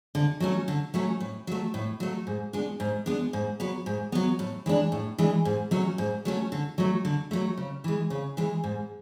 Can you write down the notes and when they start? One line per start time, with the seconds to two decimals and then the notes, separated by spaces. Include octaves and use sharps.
0.15 D3
0.40 F#3 A3 C#4
0.68 D3
0.94 F#3 A3 C#4
1.20 A2
1.47 F#3 A3
1.74 A2
2.00 F#3 A3
2.27 G#2
2.53 G#3 B3 D4
2.80 G#2
3.06 G#3 B3 D4
3.33 G#2
3.60 F#3 B3
3.86 G#2
4.12 F#3 B3
4.39 A2
4.66 E3 G#3 D4
4.92 A2
5.18 E3 G#3 D4
5.45 G#2
5.71 F#3 A3 C#4
5.98 G#2
6.25 F#3 A3 C#4
6.52 D3
6.78 F#3 A3
7.05 D3
7.31 F#3 A3
7.58 C#3
7.84 E3 G#3
8.10 C#3
8.37 E3 G#3
8.64 G#2